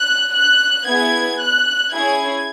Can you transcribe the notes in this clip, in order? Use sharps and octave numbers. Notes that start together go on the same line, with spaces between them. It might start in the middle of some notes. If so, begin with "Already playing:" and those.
Already playing: F#6
F#6
B3 E4 G#4 G#6
F#6
C#4 E4 G#4 G#6